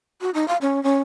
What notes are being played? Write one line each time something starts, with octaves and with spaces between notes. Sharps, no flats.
F#4
D#4
F5
C#4
C#4